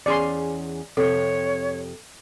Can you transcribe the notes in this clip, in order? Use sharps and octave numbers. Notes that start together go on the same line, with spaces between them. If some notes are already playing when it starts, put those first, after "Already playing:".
E2 C#4 G#4 D5 C6
F2 C3 A4 C#5